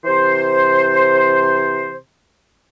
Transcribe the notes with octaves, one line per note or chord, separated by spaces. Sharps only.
C3 E3 C5